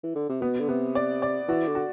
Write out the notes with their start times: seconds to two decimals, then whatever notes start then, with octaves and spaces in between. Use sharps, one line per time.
0.03 E3
0.15 D3
0.30 C3
0.41 B2 B3
0.60 D3
0.68 C3 B3
0.95 D5
1.22 D5
1.48 E3 F#4
1.67 D3
1.75 F#4